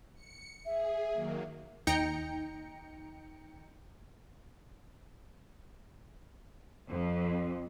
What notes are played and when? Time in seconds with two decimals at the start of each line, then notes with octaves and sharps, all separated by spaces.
0.14 C#7
0.66 G#4 E5
1.12 D#3 F#3 A#3
1.87 D#2 D#4 G5 A#5 C#7
6.89 F2